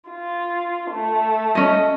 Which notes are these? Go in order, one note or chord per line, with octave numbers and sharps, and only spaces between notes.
F4
A3
C#4 D#5